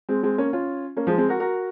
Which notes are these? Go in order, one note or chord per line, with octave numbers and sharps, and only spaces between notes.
G#3 C4
G#3 C4
A#3 C#4
C#4 F4
A#3 C#4
F3 G#3
G#3 C4
F#4 A#4
F#4 A#4